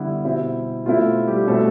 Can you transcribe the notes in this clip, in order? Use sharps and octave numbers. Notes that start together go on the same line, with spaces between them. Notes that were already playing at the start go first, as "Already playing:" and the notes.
Already playing: D3 G3 B3 E4
B2 G3 C4 E4
B2 A3 C4 E4 F4
G3 G4
B2 G3 A3 C4 E4 A4